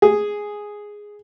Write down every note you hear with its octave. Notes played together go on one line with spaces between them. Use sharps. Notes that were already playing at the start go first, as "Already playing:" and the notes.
G#4